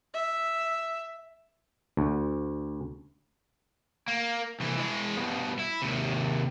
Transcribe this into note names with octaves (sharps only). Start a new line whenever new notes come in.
E5
D2
A#3
C2 E3
E3 G#3
G2 B2
E4
D#2 C3